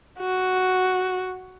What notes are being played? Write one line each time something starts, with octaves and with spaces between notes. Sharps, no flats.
F#4